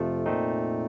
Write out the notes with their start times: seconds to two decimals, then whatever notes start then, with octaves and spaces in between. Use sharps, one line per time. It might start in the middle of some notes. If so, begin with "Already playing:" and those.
Already playing: F2 C3 F3 A3
0.26 A#2 A3 C4 D#4